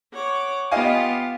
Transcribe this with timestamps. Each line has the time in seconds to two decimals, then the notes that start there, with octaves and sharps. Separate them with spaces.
0.13 C#5 F#5 D6
0.71 B3 F4 G4 D#5 F5 G#5